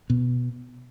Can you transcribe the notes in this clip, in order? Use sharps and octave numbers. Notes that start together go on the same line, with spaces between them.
B2